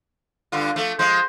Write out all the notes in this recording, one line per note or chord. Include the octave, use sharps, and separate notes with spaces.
G2 D3 F4
F3 A3
F3 G#3 C5